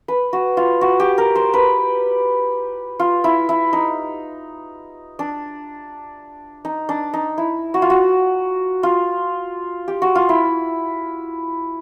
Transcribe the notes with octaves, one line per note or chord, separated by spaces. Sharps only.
B4
F#4
F4
F#4
G4
A#4
C5
B4
F4
E4
E4
D#4
D4
D#4
D4
D#4
E4
F#4
F4
F#4
F4
G4
F#4
F4
E4